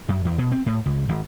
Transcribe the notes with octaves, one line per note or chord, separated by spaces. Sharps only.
F#2
E2
B2
C4
A2
C#2
G#1